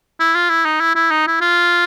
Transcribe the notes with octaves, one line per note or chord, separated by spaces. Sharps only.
E4
F4
E4
D#4
E4
E4
D#4
E4
F4